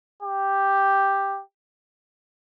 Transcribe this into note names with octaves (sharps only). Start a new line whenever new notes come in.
G4